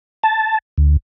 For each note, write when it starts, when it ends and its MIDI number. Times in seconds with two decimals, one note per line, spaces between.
0.23 0.58 81
0.78 0.97 38